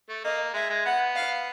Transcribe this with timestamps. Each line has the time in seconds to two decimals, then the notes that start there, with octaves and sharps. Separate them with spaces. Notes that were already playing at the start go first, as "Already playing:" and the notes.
0.09 A3
0.24 A#3 D#5
0.54 G#3 E5
0.70 G#3
0.85 B3 F#5
1.15 F5